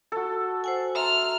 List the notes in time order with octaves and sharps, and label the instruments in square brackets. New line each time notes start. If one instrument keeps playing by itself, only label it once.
[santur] F#4 A4
[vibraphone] C5 F#5 G#5
[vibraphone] E5 A#5 C6 [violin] F6